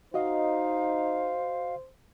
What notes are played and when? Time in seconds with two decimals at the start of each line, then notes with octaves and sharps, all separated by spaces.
0.14 D#4 F#4 C5 D#5 F5